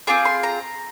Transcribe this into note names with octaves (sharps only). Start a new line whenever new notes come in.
C4 F4 G#4 D6
C6
A#5